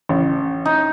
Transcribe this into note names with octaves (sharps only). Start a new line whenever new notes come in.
A1
D#4